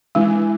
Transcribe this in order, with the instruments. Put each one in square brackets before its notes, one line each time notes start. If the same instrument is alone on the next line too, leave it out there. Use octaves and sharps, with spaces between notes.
[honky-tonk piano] E3 [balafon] G#3